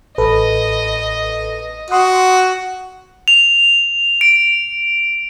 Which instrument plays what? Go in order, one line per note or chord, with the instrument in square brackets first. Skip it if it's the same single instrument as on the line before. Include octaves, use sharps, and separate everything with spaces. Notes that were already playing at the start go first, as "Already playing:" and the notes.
[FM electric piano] A1 A4 B4 [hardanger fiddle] D#5
[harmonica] F#4 [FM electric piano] C6 D#6 F#6
[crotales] F7
D7